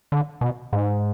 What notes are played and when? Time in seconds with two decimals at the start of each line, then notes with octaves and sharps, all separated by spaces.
0.12 D3
0.41 B2
0.73 G#2